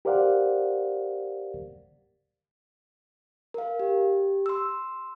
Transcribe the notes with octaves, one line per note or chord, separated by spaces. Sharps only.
G4 A#4 C5 D5 F5 F#5
A#4 F5
G4
C6 E6